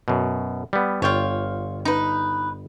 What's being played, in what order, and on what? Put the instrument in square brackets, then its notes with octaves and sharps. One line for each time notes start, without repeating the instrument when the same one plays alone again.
[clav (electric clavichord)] F#2 B2
G3 B3
[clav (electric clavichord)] G1 G5 [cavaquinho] F4 C#5
[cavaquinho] D#4 B4